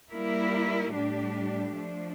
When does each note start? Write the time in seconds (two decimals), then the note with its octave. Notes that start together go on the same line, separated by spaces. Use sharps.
0.10 G3 A#3 E4 A#4
0.93 A2 G3 D4 G4
1.75 F3 A3 D4